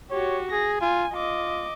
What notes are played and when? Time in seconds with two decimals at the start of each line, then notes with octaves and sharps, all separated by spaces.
0.11 F#4 G4 C#5
0.51 G#4 A#6
0.81 F4 G#5
1.13 F4 D#5 D6